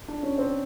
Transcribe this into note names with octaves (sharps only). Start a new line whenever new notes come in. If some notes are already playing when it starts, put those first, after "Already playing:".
D4
C#4
C4